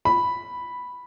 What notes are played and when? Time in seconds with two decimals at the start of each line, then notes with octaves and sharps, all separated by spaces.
0.05 B5